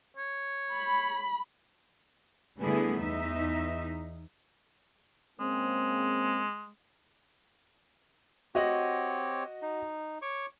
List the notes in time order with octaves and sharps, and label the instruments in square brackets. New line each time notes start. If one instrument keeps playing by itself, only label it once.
[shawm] C#5
[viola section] B5
[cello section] D3 G3 A3 B3 E4 G#4
E2 D#4 E5
[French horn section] C#3 A#3 C4 [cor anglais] G#3
[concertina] C4 G4 C#5 [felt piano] F#4 D#5 F#5
[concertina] D#4
C#5 C#6 D6